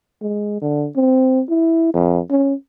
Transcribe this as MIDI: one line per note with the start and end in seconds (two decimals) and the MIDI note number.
0.22 0.58 56
0.61 0.87 50
0.96 1.42 60
1.49 1.93 64
1.94 2.20 41
2.30 2.54 61